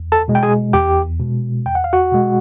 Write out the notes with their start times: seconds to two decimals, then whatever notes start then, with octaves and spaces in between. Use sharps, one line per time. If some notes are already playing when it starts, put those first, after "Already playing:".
Already playing: E2
0.12 A4 A5
0.28 B2 G#3
0.35 G5
0.43 G#4 G#5
0.73 E2 G4 G5
1.20 B2 G#3
1.66 E2 G5
1.75 F#5
1.84 F5
1.93 F#4 F#5
2.12 B2 G#3